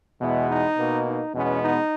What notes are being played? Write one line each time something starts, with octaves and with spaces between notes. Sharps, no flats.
E2 B2 G#3 B3 E4
D#4
B2 A#3
D#4
E2 B2 G#3 B3 C#4
D#4